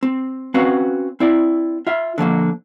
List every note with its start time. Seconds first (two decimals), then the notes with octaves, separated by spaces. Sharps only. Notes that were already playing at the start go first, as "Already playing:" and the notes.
0.03 C4
0.54 C4 C#4 F#4 B4 F5
1.20 C4 E4 D5
1.87 F4 E5
2.18 D3 F3 F#3 A#3